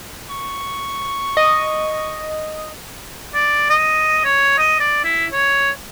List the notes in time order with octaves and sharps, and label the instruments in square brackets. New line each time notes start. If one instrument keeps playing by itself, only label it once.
[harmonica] C#6
[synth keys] D#5
[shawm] D5
D#5
C#5
D#5
D5
E4
C#5